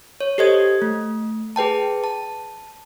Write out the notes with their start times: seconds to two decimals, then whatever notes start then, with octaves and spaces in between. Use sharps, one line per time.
0.20 C#5
0.38 G4 A4 C5 D#5 G#6
0.82 A3
1.56 G#4 B4 G5 A5
2.04 A5